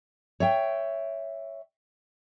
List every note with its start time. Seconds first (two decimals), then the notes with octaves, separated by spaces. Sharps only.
0.40 C#5 E5 G5